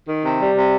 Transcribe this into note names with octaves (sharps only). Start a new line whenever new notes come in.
D#3
C3
G3
C3